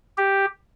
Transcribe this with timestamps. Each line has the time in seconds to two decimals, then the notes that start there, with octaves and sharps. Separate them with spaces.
0.17 G4